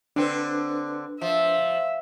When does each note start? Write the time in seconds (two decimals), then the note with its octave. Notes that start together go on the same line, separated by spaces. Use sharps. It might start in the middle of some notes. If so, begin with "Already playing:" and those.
0.16 D3 C4 D4 B4
1.22 F3 E5